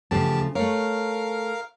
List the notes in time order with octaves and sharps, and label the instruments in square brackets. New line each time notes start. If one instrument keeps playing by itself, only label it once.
[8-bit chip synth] E2 G4 A5 [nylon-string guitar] C#3 F3 A3
[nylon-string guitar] A3 C#5 [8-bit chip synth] A#4 F5